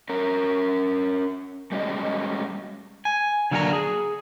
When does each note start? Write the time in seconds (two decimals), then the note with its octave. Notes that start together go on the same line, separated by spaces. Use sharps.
0.09 C#4 A#4
1.72 G3 G#3 C#4 F#4 D#5
3.05 G#5
3.51 D3 F#3 A#3 D4 F#5 A#5
3.73 G#4